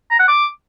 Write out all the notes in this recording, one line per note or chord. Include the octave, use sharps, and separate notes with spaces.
A#5
F#5
D6